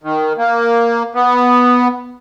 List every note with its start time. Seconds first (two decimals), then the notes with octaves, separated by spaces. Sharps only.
0.03 D#3
0.38 A#3
1.15 B3